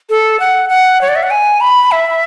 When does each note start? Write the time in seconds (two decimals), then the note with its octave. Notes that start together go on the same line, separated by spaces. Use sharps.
0.10 A4
0.40 F#5
0.69 F#5
1.01 C#5
1.08 D5
1.16 E5
1.23 F#5
1.31 G#5
1.60 B5
1.91 E5